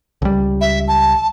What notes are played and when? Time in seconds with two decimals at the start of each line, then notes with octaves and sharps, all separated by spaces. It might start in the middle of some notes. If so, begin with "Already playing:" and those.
0.22 C#2 G3
0.61 E5
0.88 A5